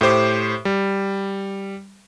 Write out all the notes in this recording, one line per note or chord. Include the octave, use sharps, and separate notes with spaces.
A2 G4 C5 D6
G3